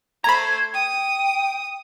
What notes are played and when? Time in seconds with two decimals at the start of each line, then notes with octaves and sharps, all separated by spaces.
0.24 A3 C5 A#5 B5 G#6
0.74 G5 D#6